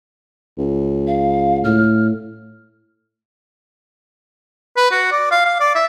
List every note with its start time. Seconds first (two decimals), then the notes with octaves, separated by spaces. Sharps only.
0.58 C#2
1.07 F5
1.64 A2 F6
4.77 B4
4.91 F#4
5.12 D5
5.31 F5
5.45 F5
5.60 D5
5.75 E5